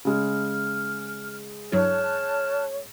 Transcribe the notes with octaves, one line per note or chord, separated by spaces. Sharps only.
C#3 G#3 F6
G2 F#3 E4 C#5 A5 F6 F#6